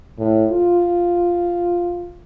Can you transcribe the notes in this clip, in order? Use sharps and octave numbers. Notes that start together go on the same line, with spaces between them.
A2
F4